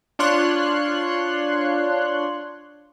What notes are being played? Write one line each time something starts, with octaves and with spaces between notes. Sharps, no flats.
D4 F4 C#5 C6 F#6